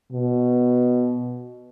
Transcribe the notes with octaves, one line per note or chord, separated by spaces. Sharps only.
B2